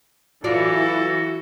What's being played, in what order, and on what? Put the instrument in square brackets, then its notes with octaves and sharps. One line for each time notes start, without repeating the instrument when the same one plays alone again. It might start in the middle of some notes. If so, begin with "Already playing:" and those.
[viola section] E3 [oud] F#3 F4 D5 [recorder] F#4 [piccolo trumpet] A4